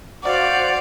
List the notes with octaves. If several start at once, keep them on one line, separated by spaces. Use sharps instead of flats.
F#4 C5 D5 F5 F#5